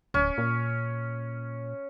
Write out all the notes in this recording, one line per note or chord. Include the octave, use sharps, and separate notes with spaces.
D1 C#4
A#2